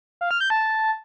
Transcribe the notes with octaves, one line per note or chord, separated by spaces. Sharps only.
F5
F6
G6
A5